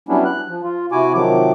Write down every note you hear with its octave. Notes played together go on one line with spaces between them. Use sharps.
F#3 G3 B3 C#4 D4 E4
F#6
F3
F4
C3 E4 F#4 G#5 D6
C3 D#3 F3 F#3 D6